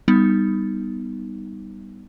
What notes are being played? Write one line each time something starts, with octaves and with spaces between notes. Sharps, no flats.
G3 B3 D#4